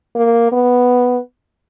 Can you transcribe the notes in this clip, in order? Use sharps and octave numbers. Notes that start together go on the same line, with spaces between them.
A#3
B3